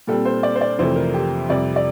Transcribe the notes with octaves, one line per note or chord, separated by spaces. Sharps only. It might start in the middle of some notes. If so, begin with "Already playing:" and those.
A#2 G3 C4 A4
C5
D5
C5
D5
F2 C3 E3 A3 C5
A#4
G4
F2 C3 G3 D5
D5